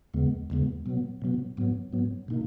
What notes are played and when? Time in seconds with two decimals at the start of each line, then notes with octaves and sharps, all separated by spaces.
0.14 D#2 C#3 G#3 B3
0.50 D#2 C#3 G#3 B3
0.86 B2 F#3 B3
1.22 B2 F#3 B3
1.57 G#2 F#3 B3
1.93 G#2 F#3 B3
2.28 B2 A#3 D#4